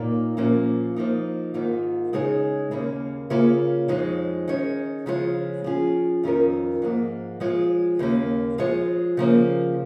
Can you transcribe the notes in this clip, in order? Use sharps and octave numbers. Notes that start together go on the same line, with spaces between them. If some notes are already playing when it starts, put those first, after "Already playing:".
Already playing: A#2 A#3 D#4 C#5
A#2 F3 A#3 C#4
F3 A#3 D#4
G#2 D#3 A#3 F4
C#3 G#3 D#4 G#4 C#5
D#2 C#3 A#3
C#3 A#3 F4 G#4 C#5
F2 F3 G#3 D#4 C#5
D#3 C#4 G#4 C#5
C#3 F3 G#3 F4 C#5
F3 C#4 F4 G#4
F2 D#3 C#4 F4 A#4
G#2 F3 A#3
F3 G#3 F4 C#5
D#2 C#3 A#3
F3 G#3 F4 G#4 C#5
C#3 F3 A#3